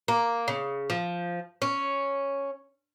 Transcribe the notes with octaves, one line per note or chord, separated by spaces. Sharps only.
A#3
C#3
F3
C#4